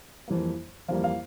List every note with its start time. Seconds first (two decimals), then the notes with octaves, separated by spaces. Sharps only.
0.28 F2 E3 G3 A#3
0.88 F2 E3 G3 A#3 F5
1.04 F5